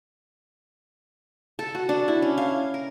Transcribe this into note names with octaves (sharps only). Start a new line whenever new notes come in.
A4
F#4
D4
E4
C#4
F5
A#4